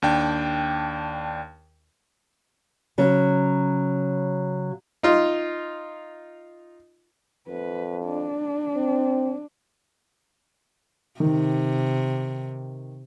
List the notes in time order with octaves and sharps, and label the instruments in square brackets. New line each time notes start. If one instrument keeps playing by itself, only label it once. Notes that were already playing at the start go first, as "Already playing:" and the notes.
[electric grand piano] D#2 D4 G5
[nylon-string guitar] C#3 F#3
[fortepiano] D#4 F4
[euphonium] F2 [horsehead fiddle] B4
[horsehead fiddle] D4
[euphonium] C4
[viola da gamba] C3 [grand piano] D#3